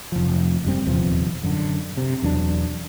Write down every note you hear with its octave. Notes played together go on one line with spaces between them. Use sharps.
F1 F3
F#1 F#2 G3 C4
D#1 E2 C3 F3
F#2 D3
C3
E1 E2 F#3 D4